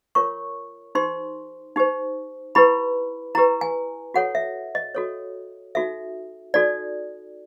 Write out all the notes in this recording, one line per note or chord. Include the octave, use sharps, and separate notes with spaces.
F4 A#4 C#5 C#6
D#4 G4 C5 C6
D#4 G4 C5
E4 G4 B4 B5
E4 G4 B4 A#5
G#5
F#4 A4 C#5 F#5
E5
D#5
F#4 A4 C#5
D#4 F#4 A4 E5
D#4 F#4 A4 D5